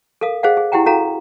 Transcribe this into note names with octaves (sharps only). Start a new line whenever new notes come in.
A4 A#4 F5 D#6
G#4 C5 D#5 F5 F#5
G#4
E4 G4 F#5 G5 A#5
C#4 F#4 A4 F5 A#5